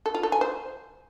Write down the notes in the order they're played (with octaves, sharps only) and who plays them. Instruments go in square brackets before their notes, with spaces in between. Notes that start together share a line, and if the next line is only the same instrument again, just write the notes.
[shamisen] A4
F4
A4
G#5
C5